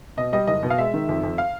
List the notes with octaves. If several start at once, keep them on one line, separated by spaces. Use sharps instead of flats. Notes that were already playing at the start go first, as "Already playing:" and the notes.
B2 D#5
G3 D#5
F#1 D#5
B2
F5
G#3 E5
D#3
F2
F2
F5